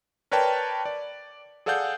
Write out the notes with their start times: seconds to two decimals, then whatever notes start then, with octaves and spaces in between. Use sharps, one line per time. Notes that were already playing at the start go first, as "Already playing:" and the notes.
0.32 A#4 B4 C#5 D5 G5 A5
0.86 D5
1.66 G#4 A4 D5 F5 F#5 G6